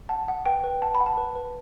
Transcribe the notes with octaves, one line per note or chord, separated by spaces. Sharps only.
F#5 A5
F#5
B4 G5
B4
F#5 A5
B5
F#5
A5
B4
B4